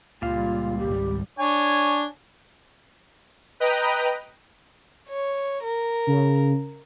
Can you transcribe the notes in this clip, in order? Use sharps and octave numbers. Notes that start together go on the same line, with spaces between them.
C#2 A#2 G3 F4 F5
G#1 G3 G4
D4 C#5 G#5
B4 D#5 G5 A#5
C#5
A#4
C#3